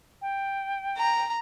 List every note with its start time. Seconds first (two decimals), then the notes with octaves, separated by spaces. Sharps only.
0.21 G5
0.97 A#5